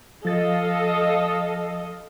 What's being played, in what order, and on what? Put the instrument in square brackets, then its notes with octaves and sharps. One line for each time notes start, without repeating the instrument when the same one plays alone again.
[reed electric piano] F3 A6 [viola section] A4 D#5 F5